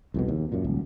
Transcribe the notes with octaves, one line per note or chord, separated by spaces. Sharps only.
C2 F2 B2
D#2
F#2 A#2
D#1 C#2